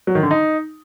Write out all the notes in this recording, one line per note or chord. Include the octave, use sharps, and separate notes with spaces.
F#3
D#3
D3
D#4